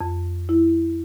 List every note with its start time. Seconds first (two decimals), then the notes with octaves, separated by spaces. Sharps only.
0.01 F2
0.49 E4